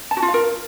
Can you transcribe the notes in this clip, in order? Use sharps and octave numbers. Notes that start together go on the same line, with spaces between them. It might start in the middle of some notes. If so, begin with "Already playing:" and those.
A5
F#4
F4
F5
A#4